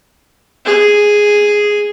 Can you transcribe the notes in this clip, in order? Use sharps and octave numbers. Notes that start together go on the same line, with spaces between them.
G#4